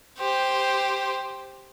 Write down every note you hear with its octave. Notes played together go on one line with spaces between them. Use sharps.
G4 C5